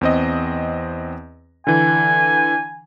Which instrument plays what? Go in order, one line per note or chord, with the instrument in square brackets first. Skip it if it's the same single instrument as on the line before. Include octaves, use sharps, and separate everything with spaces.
[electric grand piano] E2 C4 D#5
[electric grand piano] D3 E3 [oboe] G#5